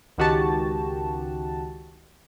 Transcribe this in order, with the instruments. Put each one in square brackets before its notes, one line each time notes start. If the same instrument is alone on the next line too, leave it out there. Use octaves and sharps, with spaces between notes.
[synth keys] C#2 D#3 F#4 G4 A5